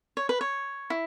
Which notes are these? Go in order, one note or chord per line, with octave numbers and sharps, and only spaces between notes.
C#5
B4
C#5
E4